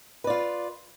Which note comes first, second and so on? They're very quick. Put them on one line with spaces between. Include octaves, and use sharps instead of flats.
B4 D5 F4